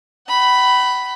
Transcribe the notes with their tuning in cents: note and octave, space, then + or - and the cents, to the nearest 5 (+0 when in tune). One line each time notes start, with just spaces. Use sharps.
F#5 +40 B5 +0